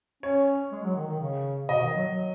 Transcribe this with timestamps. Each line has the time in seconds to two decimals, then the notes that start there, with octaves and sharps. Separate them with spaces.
0.23 C#4 C#5
0.72 G#3
0.83 F#3
0.96 D#3
1.08 D#3
1.20 C#3
1.69 B2 D#5
1.82 D#3
1.94 F#3
2.06 F#3